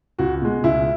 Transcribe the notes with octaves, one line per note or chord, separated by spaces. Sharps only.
C#2 F#4
B2 G#3
C#2 E4